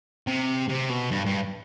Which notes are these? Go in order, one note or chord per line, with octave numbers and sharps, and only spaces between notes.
C3
C3
B2
G2
G2